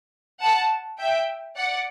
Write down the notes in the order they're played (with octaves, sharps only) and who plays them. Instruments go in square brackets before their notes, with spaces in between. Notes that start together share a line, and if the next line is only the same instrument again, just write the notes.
[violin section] F#5 A5
E5 G5
D5 F#5